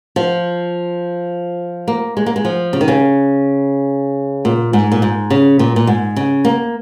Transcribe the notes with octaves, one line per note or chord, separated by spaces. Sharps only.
F3
A#3
G#3
A#3
G#3
F3
C#3
D#3
C#3
A#2
G#2
A#2
G#2
C#3
A#2
A#2
G#2
C#3
A#3